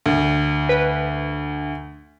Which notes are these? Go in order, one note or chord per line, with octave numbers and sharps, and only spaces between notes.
D2
B4